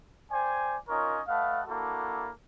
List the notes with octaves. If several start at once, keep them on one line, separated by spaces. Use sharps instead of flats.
C5 D5 G5 G#5
C#4 D#4 F4 A#4 C#5 D#5
A3 B4 D#5 F5 F#5 A5
A#3 D4 E4 F#4 A4